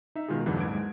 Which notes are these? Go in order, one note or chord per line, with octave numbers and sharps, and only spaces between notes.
D#4 E5
B2 D#3 G#3 F4 G#4
F2 G#2 D3 E3 F#3
D#2 G#2 G#6 D7
G#3